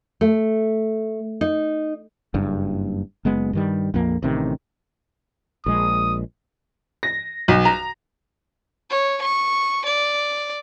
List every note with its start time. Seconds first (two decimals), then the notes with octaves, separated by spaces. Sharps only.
0.21 A3
1.41 D#4
2.34 F#1 G2
3.25 F#1 G#3 B3
3.53 G2 D#3 G3
3.94 A#1 F2 A#3
4.22 A1 C3 D#3
5.66 A#1 G#3 D#6
7.03 A#6
7.48 B1
7.65 A#5
8.90 C#5
9.22 C#6
9.85 D5